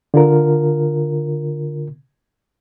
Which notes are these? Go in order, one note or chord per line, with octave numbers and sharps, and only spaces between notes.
D3 F4 A#4